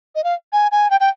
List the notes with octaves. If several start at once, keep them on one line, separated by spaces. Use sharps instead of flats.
D#5
F5
G#5
G#5
G5
G5